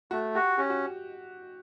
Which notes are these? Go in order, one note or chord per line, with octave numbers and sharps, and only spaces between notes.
A3 F#4
F#4 G4
C#4 G4
F#4